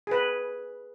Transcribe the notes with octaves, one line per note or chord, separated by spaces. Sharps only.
G#4 B4